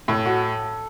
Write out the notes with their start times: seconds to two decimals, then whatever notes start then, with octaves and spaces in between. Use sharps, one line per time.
0.08 A2 A4
0.26 F#4